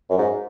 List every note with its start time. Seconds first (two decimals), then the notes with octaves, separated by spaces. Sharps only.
0.10 F#2
0.18 G#2